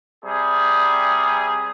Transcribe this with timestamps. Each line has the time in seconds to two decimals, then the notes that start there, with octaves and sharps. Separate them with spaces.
0.25 C3 G3 G#4